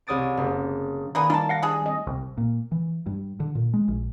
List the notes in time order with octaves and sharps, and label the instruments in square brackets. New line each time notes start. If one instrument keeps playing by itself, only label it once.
[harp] C2 C#5 D#6 A6 D7
F#1
[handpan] D#3 D#4 D5 [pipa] A#3 B3 G#4
[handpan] G3 A3 [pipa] A#3 A5 [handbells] D#4
[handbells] F5 F#5 A#6
[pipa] D4 G#4
[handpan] G3 C4 D#5
[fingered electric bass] C2
A#2
E3
G2
D3
A#2
G#3
A#1